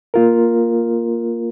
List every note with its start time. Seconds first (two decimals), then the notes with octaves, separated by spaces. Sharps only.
0.14 A#3 F4 A#4